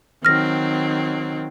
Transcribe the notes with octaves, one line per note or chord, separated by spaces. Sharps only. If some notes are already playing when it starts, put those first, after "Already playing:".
D#3 F#3 C4 F6 A#6